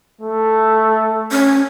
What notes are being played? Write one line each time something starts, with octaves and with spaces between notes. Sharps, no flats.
A3
C#4